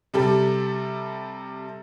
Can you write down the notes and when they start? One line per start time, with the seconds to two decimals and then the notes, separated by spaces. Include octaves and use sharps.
0.14 C3 G3 A4